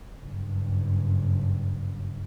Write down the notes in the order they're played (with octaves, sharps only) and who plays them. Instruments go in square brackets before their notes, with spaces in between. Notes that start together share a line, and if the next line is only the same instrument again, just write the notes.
[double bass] F#1 G2